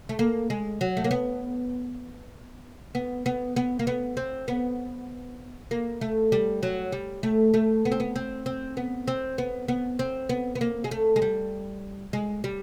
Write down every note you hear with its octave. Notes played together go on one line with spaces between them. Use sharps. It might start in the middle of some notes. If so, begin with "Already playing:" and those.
A3
A#3
G#3
F#3
A3
A#3
B3
B3
B3
B3
A#3
B3
C4
B3
A#3
A3
G3
F#3
G3
A3
A3
B3
C4
B3
C4
C4
B3
C4
B3
B3
C4
B3
B3
A#3
G#3
A3
G#3
G3
G#3
G3